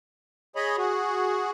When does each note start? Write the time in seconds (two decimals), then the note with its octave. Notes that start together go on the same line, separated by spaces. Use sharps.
0.56 G#4 C#5 D#5 B5
0.78 F#4 G#4